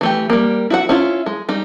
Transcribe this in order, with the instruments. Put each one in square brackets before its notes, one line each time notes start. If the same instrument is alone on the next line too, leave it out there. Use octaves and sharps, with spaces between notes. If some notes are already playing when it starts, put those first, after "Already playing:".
[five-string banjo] E3 A3 G4
G3 A#3
E4 F#4 F#5
C#4 E4 F4
G#3
G3 D#4